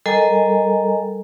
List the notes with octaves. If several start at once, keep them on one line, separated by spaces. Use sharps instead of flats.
G3 A4 A#4 D#5 G#5 A#5